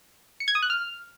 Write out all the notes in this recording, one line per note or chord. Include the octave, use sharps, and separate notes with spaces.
C#7
G#6
D#6
F#6
F6